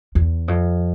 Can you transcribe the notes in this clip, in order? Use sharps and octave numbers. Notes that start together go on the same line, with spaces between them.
E2
F2